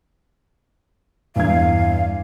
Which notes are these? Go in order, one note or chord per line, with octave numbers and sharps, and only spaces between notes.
E2 G2 F5 G#6